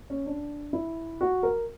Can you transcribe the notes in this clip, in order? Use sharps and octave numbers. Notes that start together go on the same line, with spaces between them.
C#4
D4
E4
F#4
A#4